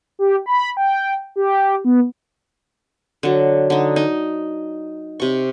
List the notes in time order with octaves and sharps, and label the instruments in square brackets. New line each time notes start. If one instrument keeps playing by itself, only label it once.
[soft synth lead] G4
B5
G5
G4
B3
[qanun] D3 F#3
D3 D#4
D#4
C3 C#6